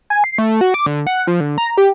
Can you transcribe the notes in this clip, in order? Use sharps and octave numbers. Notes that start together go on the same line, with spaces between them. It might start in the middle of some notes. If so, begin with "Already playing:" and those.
G#5
C7
A3
F#4
D6
D3
F#5
F3
D3
A#5
G4